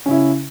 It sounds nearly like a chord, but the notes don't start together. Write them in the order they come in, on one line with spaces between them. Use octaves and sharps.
C#4 C#3 E4